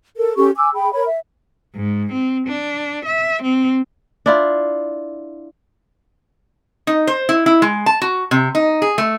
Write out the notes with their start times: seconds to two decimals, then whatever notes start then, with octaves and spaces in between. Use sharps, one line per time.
0.17 A4 A#4
0.36 C#4 G4 A4 C#6
0.56 G#5 D6 E6
0.74 G#4 G5 B5
0.93 A#4 C#5 B5
1.06 E5
1.76 G#2
2.12 C4
2.47 D4
3.05 E5
3.42 C4
4.26 D4 E4 F4
6.87 D#4
7.07 C5
7.29 E4
7.46 E4
7.62 G#3
7.86 A5
8.02 F#4
8.31 C3
8.55 D#4
8.82 G#4
8.98 A3